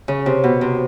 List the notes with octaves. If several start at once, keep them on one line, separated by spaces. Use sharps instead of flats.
C#3
C3
B2
C3